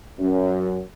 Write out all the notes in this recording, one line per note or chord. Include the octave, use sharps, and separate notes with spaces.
F#2